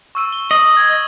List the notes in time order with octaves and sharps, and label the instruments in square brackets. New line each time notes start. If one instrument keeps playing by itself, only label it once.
[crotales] C#6 E6 D#7
G7
[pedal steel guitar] D#5 [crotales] F#7
[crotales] D#6 G#6
A#6